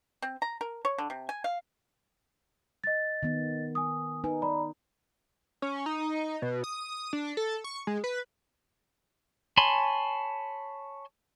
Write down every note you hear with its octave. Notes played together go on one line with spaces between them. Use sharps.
C4
A#5
A#4
C#5
D3
C3
G#5
F5
D#5 A6
D#3 B3
G#5 D#6
D#4 B4 G#5
D5 A#5 B5
C#4
D#4
B2
D#6
D4
A4
C#6
G#3
B4
C#5 G#5 A5 B5 C6